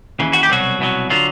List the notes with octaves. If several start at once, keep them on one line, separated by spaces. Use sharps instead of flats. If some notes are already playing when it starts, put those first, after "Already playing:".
D#2 C#3 E3
F#4
G4
C2 B2 F#3 F#4
C2 B2 F#3
D3 F#3 F4